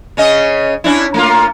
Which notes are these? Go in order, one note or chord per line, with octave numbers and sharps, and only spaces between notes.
C#3 C#4 D#5
C#4 D4 E4
A3 A#3 F4